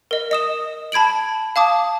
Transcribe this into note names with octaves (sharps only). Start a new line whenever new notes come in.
A#4 D#5
D#5 D#6 E7
A5 B5 G#6 D7 F#7
F5 A5 D6 D#6